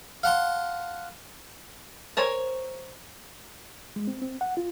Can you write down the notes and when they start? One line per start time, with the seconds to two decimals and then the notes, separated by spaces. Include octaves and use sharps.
0.23 F5 F#5 A5 C6
2.17 A#4 C5 C#5 G#5
3.96 G#3
4.07 C4
4.22 C4
4.41 F#5
4.57 F4